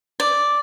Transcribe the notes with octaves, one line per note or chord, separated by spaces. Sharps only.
D5